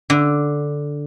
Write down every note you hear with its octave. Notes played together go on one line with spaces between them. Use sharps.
D3